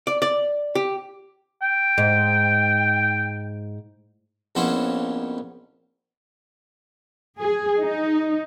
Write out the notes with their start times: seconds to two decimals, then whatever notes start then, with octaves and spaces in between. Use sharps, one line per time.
0.07 D5
0.22 D5
0.75 G4
1.62 G5
1.98 G#2
4.55 A#1 F2 B3 C#4 E4 C5
7.37 G#4
7.81 D#4